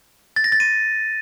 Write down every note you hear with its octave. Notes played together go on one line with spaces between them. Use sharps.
A6
A#6
A6
D#7